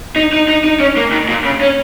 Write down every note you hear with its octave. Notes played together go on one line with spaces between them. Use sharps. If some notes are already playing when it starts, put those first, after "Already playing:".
D#4
D#4
D#4
D#4
C#4
A#3
D#3
A#2
C#3
C#4